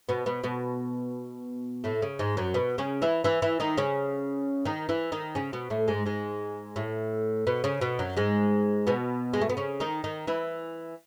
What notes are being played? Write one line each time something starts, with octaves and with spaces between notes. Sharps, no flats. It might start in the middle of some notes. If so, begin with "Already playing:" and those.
B2 B3
B2 B3
B2 B3
A2 A3
C#3
G#2 G#3
F#2 F#3
B2 B3
C#3 C#4
E3 E4
E3 E4
E3 E4
D#3 D#4
C#3 C#4
D#3 D#4
E3 E4
D#3 D#4
C#3 C#4
B2 B3
A2 A3
G#2 G#3
G#2 G#3
A2 A3
B2 B3
C#3 C#4
B2 B3
F#2 F#3
G#2 G#3
B2 B3
G#3
A3
B3
C#3 C#4
D#3 D#4
D#3 D#4
E3 E4